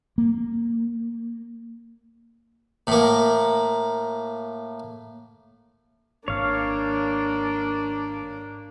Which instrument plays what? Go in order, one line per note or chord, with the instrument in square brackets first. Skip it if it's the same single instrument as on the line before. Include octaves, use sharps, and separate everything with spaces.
[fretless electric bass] A#3
[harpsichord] A2 A#3
[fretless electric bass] G#1 [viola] A#3 D4 [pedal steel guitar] C#5 F5